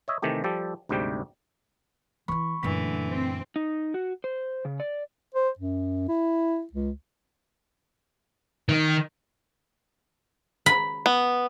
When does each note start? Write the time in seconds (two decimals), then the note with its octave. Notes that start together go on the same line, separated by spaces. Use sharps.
0.08 C#5 D#5 E5
0.22 C3 D#3 E3 A3 G4
0.44 F3 G3 G4 A4
0.89 D2 G#2 C3 G3 G4 G5
2.28 E3 E4 B5 C#6
2.63 F#2 A#2 D3 E3 A3 B6
3.10 C4
3.56 D#4
3.94 F#4
4.24 C5
4.65 C#3
4.80 D5
5.35 C5
5.59 F#2
6.08 E4
6.73 C#2
8.69 D#3
10.66 B5
11.06 B3